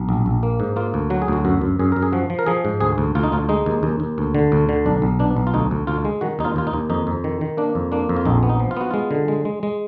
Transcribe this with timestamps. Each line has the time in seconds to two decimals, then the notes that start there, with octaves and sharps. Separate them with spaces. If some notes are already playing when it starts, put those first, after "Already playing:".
Already playing: B1
0.09 A#1
0.26 A#1
0.43 A#3
0.60 G#2
0.76 A#3 F4
0.94 D2
1.10 F#3 F#4
1.22 G#4
1.28 D2 F#4
1.45 F#2 F#4
1.61 F#2
1.79 F#2 G#4
1.92 F#2 A#4
2.02 G#4
2.12 F3 F#4
2.30 F3
2.39 A#4
2.46 F3 G#4
2.65 G#2
2.80 D2 G#4
2.98 D2
3.15 D2 F4
3.23 D#4
3.32 D2 F4
3.49 G#3 D#4
3.66 D#2
3.83 D#2
4.00 D#2
4.18 D2
4.35 D3
4.52 D2
4.69 D3
4.86 B1 D4
5.02 B1
5.19 B2 D4
5.37 B1
5.47 F4
5.54 D2 D#4
5.71 D2
5.87 D2 F4
6.05 G#3
6.21 D#3 F#4
6.39 D#2 D#4
6.45 F4
6.56 D#2 F4
6.67 D#4
6.73 D#2
6.90 F2 D#4
7.07 F2
7.24 D#3
7.41 D#3
7.57 A#3 D4
7.75 F2
7.92 A#3 D4
8.09 F2
8.16 F4
8.25 A#1 D#4
8.43 B3
8.49 D#4
8.60 F3
8.71 F4
8.77 B3 F#4
8.91 G#3 F4
9.11 D3
9.28 G#3
9.45 G#3
9.63 G#3